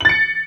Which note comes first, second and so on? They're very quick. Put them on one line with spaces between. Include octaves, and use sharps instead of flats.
F#7 A6 C#7